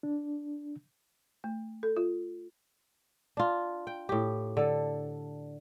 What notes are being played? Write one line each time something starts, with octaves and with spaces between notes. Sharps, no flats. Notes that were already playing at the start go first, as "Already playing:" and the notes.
D4
A3
A4
F4
D4 F4
G5
A2 G4
D3 A4